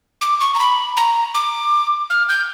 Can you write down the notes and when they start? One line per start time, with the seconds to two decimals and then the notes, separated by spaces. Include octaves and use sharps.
0.21 D6
0.40 C#6
0.55 A#5
0.59 B5
0.97 A#5
1.34 D6
2.10 F6
2.29 G6